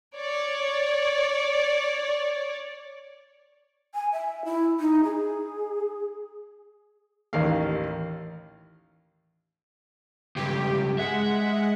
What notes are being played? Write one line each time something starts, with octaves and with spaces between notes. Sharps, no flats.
C#5 D5
G#5
E5
E4
D#4
G#4
A1 D#2 A#4 F5
C#2 G2 G4
G#3 E5 F#5